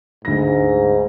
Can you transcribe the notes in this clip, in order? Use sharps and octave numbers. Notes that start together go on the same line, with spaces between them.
D2 G#2 A#6